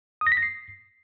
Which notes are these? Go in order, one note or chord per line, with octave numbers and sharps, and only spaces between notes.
D#6
A#6
B6
A#6
C7